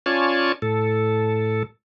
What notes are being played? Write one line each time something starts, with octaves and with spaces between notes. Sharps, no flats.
C#4 F4 C#5 D5 G#5 A5
A2 A4